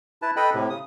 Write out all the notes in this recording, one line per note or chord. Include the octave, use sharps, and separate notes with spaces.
E4 B4 A5
A4 B4 D#5 G5 B5
A2 C3
C#3 D#6